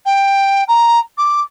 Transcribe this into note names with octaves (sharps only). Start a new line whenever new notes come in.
G5
A#5
D6